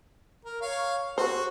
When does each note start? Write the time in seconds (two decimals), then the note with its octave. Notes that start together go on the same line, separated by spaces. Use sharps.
0.45 A#4
0.62 C#5 F5
1.18 F#4 C5